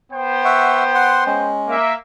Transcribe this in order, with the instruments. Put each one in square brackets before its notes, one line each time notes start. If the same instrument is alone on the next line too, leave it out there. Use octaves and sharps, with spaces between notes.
[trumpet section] B3 C5 G5
[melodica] E5 F#5 C#6
F#5 C6
G#3 C#4
[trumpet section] A#3 E5